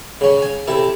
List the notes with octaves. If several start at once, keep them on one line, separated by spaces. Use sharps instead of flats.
C#3 C#4
G#5
C3 E4 A4